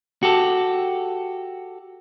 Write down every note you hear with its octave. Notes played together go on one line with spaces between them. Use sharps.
F#4 G4 A4